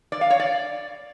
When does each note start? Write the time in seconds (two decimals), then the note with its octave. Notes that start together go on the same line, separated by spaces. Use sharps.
0.12 D5
0.21 F5
0.30 C#5
0.40 D5